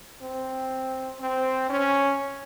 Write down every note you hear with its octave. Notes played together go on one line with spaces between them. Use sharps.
C4
C4
C#4